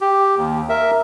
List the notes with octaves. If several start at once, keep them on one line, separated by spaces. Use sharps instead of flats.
G4
D#2
A#4 E5